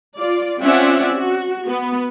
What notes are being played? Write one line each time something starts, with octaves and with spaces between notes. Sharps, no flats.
F4 D5
C4 C#4 F4 D5 E5 F#5
F#4
B3